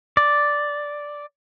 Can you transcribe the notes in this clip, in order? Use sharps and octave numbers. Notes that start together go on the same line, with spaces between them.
D5